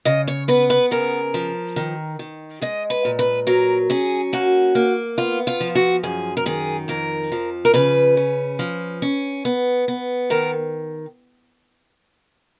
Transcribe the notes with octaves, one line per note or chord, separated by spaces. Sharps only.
C#3 D#5
C#5
B3 B4
B4
C#3 A#4
F3
D#3
D#3
G#3 D#5
B4
A#2
B4
F#3 A#4
C#4 G#4
A#3 F#4
A#3
B3 F4
F4
F3
F#4
F#2 G#4
A#4
D#3 G#4
F2 A#4
F3
A#4
C#3 B4
C#4
F3
C#4
B3
B3
D#3 A#4